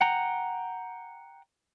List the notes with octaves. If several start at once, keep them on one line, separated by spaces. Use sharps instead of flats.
F#5 G5 A#5